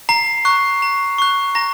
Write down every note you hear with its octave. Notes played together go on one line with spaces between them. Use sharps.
A#5 C7
C#6 F#6
A#5
C#6 F#6
A#5 A#6